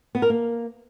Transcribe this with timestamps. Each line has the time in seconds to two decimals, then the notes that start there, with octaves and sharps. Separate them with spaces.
0.15 B3
0.22 A#4
0.30 A#3